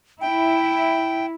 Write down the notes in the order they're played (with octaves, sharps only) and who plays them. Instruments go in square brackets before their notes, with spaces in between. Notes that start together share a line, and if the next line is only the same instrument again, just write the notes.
[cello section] E4 [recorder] G5